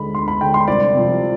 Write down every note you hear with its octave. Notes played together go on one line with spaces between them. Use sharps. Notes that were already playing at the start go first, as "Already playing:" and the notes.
Already playing: D2 D3 G#3 B5
D2 C6
B5
D3 G#3 G5
C6
C2 D5
C3 F3